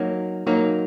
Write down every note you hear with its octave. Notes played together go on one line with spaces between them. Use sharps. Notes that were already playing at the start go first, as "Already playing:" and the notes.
Already playing: F#3 A#3 D#4
F#3 A#3 D#4